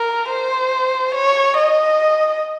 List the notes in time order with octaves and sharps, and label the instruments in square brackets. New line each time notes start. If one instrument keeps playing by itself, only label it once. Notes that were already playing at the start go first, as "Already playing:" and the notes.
Already playing: [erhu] A#4
C5
C#5
D#5